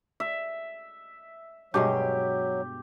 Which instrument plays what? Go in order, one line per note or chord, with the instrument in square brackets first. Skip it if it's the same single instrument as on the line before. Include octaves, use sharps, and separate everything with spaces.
[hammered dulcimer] E5
[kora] G2 B2 G#3 [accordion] F#3 [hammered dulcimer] G4